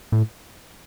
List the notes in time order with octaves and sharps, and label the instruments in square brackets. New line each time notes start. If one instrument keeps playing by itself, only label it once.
[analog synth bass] A2